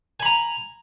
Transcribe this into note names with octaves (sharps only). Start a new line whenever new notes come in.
G#5 A#5 B5